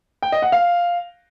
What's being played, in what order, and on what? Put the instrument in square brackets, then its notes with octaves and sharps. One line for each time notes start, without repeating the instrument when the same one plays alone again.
[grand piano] G5
D#5
F#5
F5